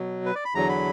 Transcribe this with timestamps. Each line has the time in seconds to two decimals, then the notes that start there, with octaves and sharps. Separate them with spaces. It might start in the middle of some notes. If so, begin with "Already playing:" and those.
Already playing: B2 F#3
0.26 B4
0.35 D5
0.45 B5
0.54 E2 D3 F#3 A#5
0.69 B5